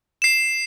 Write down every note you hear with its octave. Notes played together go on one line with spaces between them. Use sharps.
C7 E7